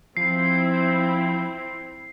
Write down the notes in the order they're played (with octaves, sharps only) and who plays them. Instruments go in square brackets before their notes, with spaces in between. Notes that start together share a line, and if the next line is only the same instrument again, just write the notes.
[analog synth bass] F3 [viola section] C4 E4 [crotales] C7